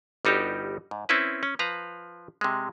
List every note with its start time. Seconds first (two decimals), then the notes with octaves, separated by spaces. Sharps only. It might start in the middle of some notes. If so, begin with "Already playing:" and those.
0.25 G1 G3 D#4 F#4 G4
0.91 G#2
1.09 C4 C#4 E4 B4
1.43 C#4
1.59 F3 B4 F5 A#5
2.41 C3 G#3